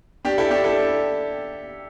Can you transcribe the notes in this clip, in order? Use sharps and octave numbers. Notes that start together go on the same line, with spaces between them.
D4 G4
E4 A4
D4 G4
E4 A4